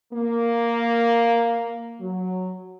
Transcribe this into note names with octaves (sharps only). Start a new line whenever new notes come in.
A#3
F#3